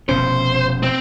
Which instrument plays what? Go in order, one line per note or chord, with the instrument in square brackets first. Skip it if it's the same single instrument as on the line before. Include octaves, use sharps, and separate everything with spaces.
[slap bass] F1 B2 C#4 [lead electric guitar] C5
[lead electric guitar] C4